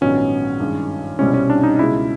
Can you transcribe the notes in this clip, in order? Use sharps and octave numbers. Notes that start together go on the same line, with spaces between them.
A#1 G#2 D#3 F#3 B3 C#4
G2 D#3 G#3
C2 B2 G3 C4 C#4 E4
C#4
D4
D#4
C#2 B2 G#3 C#4 E4